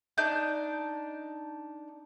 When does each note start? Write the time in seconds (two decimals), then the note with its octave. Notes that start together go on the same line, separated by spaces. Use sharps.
0.18 D4 D#4 G6